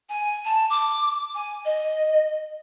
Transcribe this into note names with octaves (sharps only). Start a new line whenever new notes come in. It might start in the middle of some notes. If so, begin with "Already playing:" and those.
G#5
A5
D6
G#5
D#5